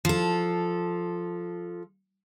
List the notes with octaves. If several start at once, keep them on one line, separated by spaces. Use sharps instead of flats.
F3 A4